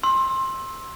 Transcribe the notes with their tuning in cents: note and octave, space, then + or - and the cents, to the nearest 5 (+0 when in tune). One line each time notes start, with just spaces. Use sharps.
C6 +20 E6 -5